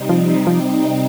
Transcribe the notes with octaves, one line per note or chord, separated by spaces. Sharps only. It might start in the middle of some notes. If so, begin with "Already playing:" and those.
Already playing: C3 G3 C4 D#4
F3
F3